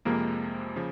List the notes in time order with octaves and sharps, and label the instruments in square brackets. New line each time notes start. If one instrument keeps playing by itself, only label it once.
[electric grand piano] F2 C3 F3 G#3 [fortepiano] A#3
[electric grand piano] C#3 F3